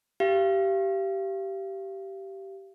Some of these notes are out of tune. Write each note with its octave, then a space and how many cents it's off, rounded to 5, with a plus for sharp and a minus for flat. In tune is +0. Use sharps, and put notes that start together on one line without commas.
G4 -15 F5 -35